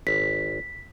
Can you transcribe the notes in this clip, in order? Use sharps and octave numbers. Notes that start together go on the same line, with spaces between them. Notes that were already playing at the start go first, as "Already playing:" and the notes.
G#1 B6